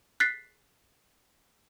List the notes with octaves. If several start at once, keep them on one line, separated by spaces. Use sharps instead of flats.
F#6 A6 B6 C7